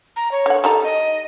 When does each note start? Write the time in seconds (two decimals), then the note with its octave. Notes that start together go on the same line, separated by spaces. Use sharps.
0.16 A#5
0.32 C#5
0.46 D3 F#5
0.64 G3 D#4 A4 A#5
0.83 D#5